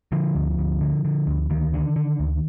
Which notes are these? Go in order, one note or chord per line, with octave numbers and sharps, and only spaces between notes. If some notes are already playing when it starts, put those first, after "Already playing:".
D3 F3
D2
D2
D3
D3
D2
D2 D#3
D3
D3
D2